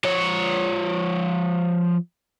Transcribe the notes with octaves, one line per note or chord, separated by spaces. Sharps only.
F3 C#5